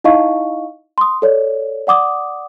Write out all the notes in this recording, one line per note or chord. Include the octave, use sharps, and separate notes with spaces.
D#4 E4 D#5 F5 C#6
C6 D#6
A4 C#5 D5
D5 F#5 D6 D#6